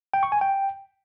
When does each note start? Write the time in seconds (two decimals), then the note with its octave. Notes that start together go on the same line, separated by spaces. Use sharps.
0.14 G5
0.23 C#6
0.32 G#5
0.41 G5